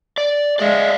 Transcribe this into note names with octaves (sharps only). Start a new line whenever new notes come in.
D5
G#3 D5 E5 F5